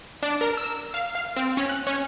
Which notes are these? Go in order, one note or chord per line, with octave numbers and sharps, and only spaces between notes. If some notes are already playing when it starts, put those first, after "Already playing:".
D4
A#4
E6
F5
F5
C4
C#4
F#6
C#4